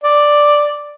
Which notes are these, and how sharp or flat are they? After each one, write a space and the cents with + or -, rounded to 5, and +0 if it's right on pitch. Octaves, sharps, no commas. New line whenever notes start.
D5 +5